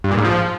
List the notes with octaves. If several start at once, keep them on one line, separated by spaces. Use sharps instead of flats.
G2
A#2
G#2
F3